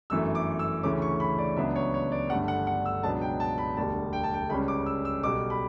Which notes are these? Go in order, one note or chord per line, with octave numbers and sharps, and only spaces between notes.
G1 F#2 E3 A3 E6
D6
E6
D2 C#3 E3 A3 C#4 D6
C#6
B5
D5
C#2 C#3 F#3 B3 D4 E5
C#5
C#5
D5
G1 G2 D3 A3 F#5
F#5
F#5
E6
C#2 B2 F#3 B3 D4 A5
G5
A5
B5
E1 D2 D3 G3 A5
G5
A5
G5
C#2 C#3 G3 C#4 B5
D6
E6
E6
B1 B2 G3 D6
B5